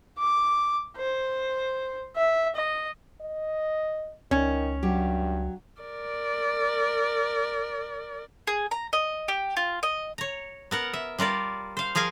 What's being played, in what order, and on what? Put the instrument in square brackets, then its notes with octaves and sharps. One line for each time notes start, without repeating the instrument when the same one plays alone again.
[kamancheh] D6
C5
E5
D#5
[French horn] D#5
[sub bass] C#2 [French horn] D#3 [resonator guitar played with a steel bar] C#4
[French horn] G2 [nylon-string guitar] F#3 G4
[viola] A#4 D5
[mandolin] G#4
A#5
D#5
G4
F4
D#5
[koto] C#5 A#5
B3 A#4 F#5
E5
G3 F4 A#4 D5
C5 F5
F3 G#4 A#4 F5 G#5